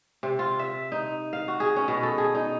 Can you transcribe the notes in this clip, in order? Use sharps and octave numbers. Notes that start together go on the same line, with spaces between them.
C3
F4
E5
D#4
F5
F#4
G#4
C#4
B2
A4
G#4
D#4